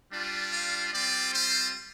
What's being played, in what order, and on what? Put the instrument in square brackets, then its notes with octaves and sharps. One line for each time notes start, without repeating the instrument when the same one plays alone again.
[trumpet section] G3 D4 F4
F5
G3 C4 F4 D5
C5